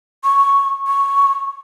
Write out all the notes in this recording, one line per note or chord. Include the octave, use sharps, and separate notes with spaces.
C#6
C#6